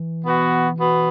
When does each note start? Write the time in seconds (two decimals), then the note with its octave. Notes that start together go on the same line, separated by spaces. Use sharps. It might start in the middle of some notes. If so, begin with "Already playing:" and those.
Already playing: E3
0.25 B2 B3 F#4
0.79 B2 B3